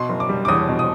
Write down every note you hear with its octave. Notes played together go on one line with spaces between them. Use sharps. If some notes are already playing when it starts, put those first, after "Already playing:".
Already playing: B2 C6
F#1
D6
G3
D6
E2 D#6
B2
D#6